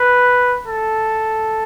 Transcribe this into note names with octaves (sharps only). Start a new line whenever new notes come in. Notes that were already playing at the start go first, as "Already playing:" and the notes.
Already playing: B4
A4